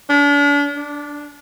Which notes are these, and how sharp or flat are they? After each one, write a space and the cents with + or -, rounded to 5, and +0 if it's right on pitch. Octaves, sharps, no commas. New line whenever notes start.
D4 -40
D4 -5